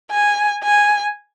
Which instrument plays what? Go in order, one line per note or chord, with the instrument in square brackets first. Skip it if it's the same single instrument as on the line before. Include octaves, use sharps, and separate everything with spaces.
[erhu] G#5
G#5